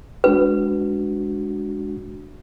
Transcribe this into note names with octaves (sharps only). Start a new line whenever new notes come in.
G#3 D4 F#4 B4